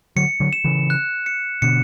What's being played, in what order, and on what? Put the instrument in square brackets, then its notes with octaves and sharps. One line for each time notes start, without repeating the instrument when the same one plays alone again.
[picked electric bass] D3 F#3 [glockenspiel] C#7
[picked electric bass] D3 F#3
[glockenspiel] E7
[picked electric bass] C#3 E3
[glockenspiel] F#6
C#7
[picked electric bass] B2 D3 [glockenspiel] C#7